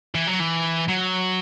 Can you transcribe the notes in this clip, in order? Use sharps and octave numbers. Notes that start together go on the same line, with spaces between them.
E3
F#3
E3
F#3